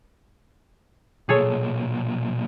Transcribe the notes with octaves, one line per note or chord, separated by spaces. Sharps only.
B1 A#2 G#4 A4 C#5